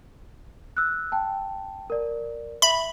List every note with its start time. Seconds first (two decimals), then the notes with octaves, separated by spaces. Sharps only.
0.77 E6 F#6
1.12 G5 A5
1.90 A#4 D5
2.62 E5 B5